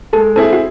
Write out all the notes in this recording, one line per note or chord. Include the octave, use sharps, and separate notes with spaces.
G#3 A4
C4 E4 G#4 A4
F#4